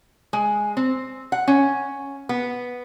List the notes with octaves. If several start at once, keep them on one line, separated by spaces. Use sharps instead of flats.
G#3
C4
F#5
C#4
B3